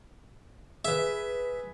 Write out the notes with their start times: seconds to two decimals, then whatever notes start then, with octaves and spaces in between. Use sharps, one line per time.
0.85 G#4 B4 E5